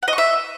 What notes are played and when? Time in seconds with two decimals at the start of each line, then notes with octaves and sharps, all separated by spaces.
0.03 F#5
0.08 D#5
0.13 C#6
0.18 E5